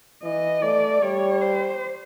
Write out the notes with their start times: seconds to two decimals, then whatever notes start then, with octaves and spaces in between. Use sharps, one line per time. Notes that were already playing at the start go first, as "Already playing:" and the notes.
0.24 E3 D#5
0.62 A3 D5
1.02 G3 C#5
1.41 C5